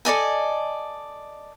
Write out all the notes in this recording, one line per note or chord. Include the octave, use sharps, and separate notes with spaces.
A4 D5 D#5 G#5